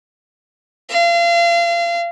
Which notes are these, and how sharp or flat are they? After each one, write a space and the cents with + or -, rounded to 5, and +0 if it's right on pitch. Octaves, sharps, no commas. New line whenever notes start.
F5 -35